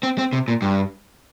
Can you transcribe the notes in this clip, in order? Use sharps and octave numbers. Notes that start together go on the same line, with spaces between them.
C4
C4
C3
A#2
G2